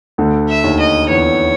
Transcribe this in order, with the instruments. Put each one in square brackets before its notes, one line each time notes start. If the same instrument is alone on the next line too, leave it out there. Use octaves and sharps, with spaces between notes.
[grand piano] D2 D3
[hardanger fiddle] E5
[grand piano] D#2 D#3
[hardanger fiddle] D#5
[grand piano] E2 E3 [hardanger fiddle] C#5